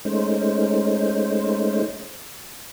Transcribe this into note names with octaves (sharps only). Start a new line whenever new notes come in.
G#3 A3 C#4 D#4 C5